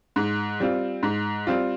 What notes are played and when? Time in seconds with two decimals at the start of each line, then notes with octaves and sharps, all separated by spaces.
0.16 G#2
0.60 G3 C4 F4
1.03 G#2
1.47 G3 C4 F4